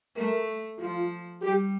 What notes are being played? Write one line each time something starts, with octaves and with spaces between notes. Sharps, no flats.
A3 A#4
F3 F4
G3 G4